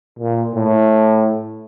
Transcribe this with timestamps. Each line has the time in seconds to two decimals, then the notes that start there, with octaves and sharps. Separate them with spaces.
0.19 A#2
0.55 A2